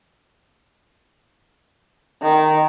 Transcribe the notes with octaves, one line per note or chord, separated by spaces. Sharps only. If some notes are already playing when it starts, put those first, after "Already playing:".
D#3